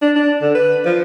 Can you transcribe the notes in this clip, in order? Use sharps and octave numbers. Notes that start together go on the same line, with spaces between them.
D4
D4
D3
B4
F3